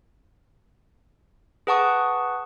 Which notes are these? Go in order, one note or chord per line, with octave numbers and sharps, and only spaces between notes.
G#4 B4 F#5 A5 C#6 D#6